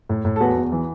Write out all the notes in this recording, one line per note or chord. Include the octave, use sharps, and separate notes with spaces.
A2
A2
A4
E2 F#4 B4
E2
E3